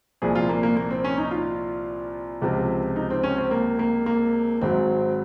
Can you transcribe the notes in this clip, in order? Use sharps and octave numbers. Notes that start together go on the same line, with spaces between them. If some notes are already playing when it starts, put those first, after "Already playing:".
C2 A#2 F3 G#4
F4
A#3
A#3
A#3
C4
C#4
D#4
F4
C#2 C3 F3
D#4
C4
C#4
C4
A#3
A#3
A#3
G#1 G#2 F#3 C4